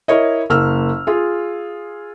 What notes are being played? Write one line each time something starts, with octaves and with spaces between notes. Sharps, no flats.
E4 A#4 C#5 D#5
F#1 A#3 E6 F6
F4 G#4